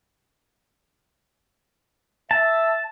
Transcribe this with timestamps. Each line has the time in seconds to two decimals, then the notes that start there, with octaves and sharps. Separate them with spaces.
2.31 E5 A5